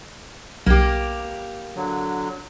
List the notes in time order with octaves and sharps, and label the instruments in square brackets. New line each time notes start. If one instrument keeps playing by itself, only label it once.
[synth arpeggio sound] B1 [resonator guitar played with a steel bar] A#3 G4
[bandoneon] D3 F#3